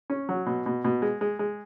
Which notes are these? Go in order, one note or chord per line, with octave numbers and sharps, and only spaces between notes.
C#4
F#3
B2
B2
B2
G#3
G#3
G#3